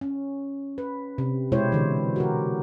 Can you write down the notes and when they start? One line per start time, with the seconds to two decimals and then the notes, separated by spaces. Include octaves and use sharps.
0.01 C#4
0.78 B4
1.18 C3
1.52 B2 G#3 E4 G4 C5 C#5
1.72 D3 E3
2.16 F#4 G4 A#4